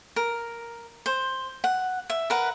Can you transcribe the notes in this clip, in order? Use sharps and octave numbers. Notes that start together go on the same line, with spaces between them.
A#4
C5
F#5
E5
A#4 B4 F#5